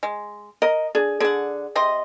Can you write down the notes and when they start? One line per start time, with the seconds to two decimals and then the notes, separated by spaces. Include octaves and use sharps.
0.03 G#3
0.62 A#4 D#5
0.95 D4 G#4
1.20 D3 G#4 D5 F#5
1.76 C3 D#5 C6